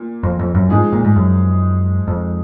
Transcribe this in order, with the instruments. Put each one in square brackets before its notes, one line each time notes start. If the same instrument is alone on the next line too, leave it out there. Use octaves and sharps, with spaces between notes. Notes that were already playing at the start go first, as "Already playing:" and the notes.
Already playing: [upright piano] A#2
[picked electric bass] F2
F2
F#2
[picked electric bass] G#2 [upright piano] F3 G#3 D#4 G#4
[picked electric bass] A#2
G#2
F#2
F2